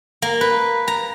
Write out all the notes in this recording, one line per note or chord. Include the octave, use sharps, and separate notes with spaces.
A#3
B4
A#5